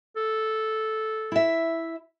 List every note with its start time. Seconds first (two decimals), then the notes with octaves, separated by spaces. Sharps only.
0.16 A4
1.32 E4 E5